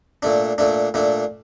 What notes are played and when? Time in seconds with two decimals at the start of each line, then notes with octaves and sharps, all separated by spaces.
0.23 A#2 A3 D4
0.58 A#2 A3 D4
0.94 A#2 A3 D4